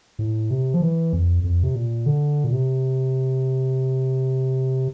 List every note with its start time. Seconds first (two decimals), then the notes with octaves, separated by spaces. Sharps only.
0.19 A2
0.51 C3
0.74 F3
0.82 E3
1.13 F2
1.44 F2
1.63 C3
1.75 A#2
2.06 D3
2.44 A#2
2.52 C3